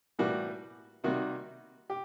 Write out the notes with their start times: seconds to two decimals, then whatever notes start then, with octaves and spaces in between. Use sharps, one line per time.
0.19 A2 E3 G3 A#3 F#4
1.04 C3 D#3 G3 A#3 F#4
1.90 G4